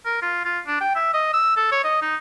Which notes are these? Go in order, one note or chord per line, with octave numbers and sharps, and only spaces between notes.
A#4
F4
F4
D4
G5
E5
D#5
E6
A4
C#5
D#5
D#4